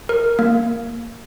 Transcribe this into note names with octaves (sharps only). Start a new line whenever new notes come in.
A#4
A#3